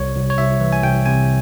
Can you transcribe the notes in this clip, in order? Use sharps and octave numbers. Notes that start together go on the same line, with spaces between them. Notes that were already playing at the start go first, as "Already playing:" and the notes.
Already playing: C2 C#5
C2
C#5
C2 E5
E3
G#5
C2 G5
C3 G#5